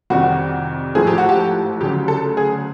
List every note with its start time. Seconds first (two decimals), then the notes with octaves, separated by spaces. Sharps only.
0.10 F2 C3 D#3 G3 F#4
0.95 A1 G#2 F3 A3 G#4
1.07 G4
1.18 F#4
1.29 G4
1.81 D2 C#3 F#3 G4
2.08 A4
2.37 G#4